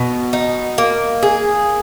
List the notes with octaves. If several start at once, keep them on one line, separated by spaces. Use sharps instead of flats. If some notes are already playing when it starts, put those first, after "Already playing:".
Already playing: B2
D#4
A#3
G#4